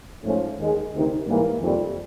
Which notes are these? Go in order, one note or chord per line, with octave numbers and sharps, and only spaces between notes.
G#2 F3 A3 C#4
D#2 D#3 G#3
D2 C3 D#3
G#2 E3 G3 A#3
F2 C3 D#3 G3